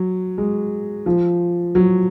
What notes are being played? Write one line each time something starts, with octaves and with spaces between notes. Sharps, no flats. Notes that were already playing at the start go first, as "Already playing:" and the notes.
Already playing: F#3
G#3
F3
F#3